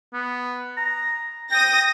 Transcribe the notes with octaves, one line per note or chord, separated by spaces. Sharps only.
B3
A#5
G5 D#6 A#6